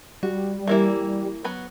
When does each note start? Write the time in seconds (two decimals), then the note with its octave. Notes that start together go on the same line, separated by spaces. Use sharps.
0.23 G3 F#4
0.68 E3 A#3 E4
1.44 F#3 B3 B5